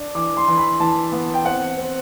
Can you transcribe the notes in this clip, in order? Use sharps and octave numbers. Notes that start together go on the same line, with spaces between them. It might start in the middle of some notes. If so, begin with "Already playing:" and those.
Already playing: D4
E3 D6
C6
E3
B5
E3 A5
B3
G5
C4 F#5
C4